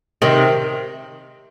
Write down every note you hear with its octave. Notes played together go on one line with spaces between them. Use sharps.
C3 D#3